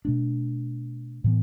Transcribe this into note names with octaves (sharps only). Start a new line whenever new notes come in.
B2 A3 D4
A2 E3 B3